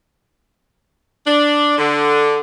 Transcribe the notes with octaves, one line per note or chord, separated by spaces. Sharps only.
D4
D3